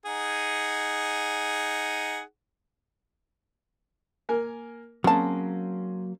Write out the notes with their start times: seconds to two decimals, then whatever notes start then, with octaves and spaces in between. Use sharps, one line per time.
0.06 D#4 G#4 F#5
4.29 A#3 A#4 G#5
5.04 C#3 F#3 A#3 C4 C#4 A5